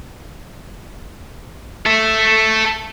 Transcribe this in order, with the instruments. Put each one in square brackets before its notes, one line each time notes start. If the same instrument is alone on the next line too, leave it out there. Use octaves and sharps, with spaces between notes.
[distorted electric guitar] A4 E5